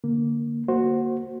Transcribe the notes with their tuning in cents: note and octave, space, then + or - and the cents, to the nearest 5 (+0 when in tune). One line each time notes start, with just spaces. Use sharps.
D3 +0 A#3 +0
A#3 +0 F#4 +0 C5 +15